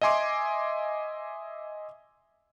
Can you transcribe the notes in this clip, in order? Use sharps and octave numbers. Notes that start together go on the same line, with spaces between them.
D#5 E5 G#5 C6 D6